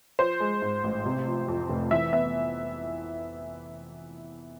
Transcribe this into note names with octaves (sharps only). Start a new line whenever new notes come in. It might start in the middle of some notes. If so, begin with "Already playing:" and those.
F3 C5
G#3
G#2
A1
C3
F3
F2
F1
E3 E5
B3 E5